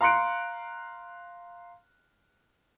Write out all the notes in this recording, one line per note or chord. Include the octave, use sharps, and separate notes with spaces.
F5 A#5 C6 F#6 C#7 D7